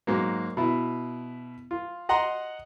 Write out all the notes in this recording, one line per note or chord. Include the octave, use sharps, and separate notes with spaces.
G#2 F#3 A#3
B2 E4
F4
D#5 F#5 A#5 C6